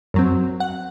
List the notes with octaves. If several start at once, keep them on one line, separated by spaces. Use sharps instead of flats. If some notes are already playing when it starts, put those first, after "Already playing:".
F#2 F#3 C4
F#5